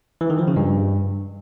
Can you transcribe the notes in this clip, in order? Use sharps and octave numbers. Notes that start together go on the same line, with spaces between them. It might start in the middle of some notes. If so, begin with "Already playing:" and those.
E3
D#3
F3
C#3
G2